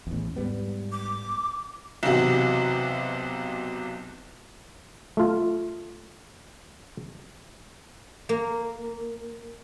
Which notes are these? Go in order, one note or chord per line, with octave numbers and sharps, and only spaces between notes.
A1 E2
G#2 G3 B3
D6
B1 E2 C3 F#4
A3 F4
A#3